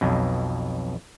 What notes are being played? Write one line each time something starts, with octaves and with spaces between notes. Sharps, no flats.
B1 F2 B2